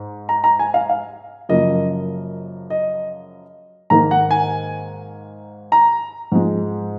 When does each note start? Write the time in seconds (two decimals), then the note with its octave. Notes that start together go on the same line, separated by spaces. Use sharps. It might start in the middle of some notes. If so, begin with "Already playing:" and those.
Already playing: G#2
0.29 A#5
0.44 A#5
0.59 G#5
0.74 F5
0.89 F5
1.49 F#2 C#3 F3 A#3 D#5
2.70 D#5
3.90 G#2 D#3 A#3 A#5
4.11 F#5
4.31 G#5
5.72 A#5
6.32 G#2 F3 G#3